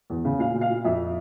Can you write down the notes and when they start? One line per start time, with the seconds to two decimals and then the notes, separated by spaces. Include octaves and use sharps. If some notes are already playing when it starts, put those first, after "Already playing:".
0.10 E2
0.25 C#3
0.39 A#2 F5
0.54 A#2
0.61 F5
0.70 A#2
0.84 F2 E5